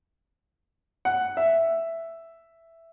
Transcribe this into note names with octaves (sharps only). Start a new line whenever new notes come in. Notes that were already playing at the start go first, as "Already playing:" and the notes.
F#5
E5